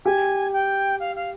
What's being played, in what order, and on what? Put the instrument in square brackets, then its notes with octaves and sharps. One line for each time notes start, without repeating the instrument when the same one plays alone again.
[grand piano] G4 [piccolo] G#5
[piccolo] G5
F5
F5